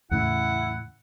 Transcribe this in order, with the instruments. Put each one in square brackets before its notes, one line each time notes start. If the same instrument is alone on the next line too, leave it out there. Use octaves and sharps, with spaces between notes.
[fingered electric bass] E2 A2 C#3 [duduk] E4 [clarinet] F#5